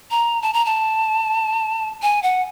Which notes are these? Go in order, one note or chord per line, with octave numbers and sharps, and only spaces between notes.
A#5
A5
A#5
A5
G#5
F#5